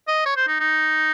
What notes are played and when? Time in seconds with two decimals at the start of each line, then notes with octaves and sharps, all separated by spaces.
0.08 D#5
0.26 C#5
0.36 C5
0.48 D#4
0.60 D#4